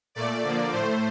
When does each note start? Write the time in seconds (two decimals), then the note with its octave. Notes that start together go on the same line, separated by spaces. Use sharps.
0.15 A#2 A3 D5
0.43 D3 F3 A#3
0.72 A2 A3 C5